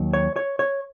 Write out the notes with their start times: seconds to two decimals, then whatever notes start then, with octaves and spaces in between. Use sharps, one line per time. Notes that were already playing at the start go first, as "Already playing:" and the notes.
Already playing: D#2 D#3 F#3
0.13 C#5
0.36 C#5
0.59 C#5